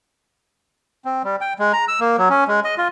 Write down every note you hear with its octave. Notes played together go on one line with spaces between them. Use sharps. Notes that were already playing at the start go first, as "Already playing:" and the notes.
C4
G3
G5
G#3
A#5
E6
A#3
F#3
C#4
G#3
D#5
F4